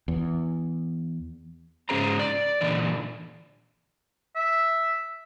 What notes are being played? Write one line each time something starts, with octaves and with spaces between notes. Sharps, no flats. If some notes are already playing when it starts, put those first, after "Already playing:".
E2
G#2 F3 C#4 G#4 C5 A#5
D5
A#2 D3 E3 D5
E5